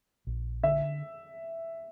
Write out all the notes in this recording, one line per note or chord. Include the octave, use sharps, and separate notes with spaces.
A#1
D3 E5